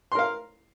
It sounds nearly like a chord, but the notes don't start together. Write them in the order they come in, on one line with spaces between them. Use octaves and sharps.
C6 A#4 F5